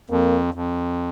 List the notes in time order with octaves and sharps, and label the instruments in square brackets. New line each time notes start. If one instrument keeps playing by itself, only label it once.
[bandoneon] F2 [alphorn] A#3
[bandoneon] F2